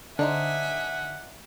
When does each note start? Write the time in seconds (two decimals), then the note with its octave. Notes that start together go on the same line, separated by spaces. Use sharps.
0.19 D3 D4 D#4 C5 E5 F#5 G#5